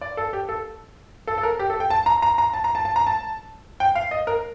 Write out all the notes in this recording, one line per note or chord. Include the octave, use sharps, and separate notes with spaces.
D5
A4
G4
A4
A4
A4
A#4
G4
A4
G5
A5
A#5
A#5
A#5
A5
A#5
A5
A5
A#5
A5
G5
F5
D#5
A#4